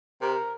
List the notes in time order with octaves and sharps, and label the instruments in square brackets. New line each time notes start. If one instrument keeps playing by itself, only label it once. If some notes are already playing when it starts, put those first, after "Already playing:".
[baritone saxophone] C3 [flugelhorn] A#4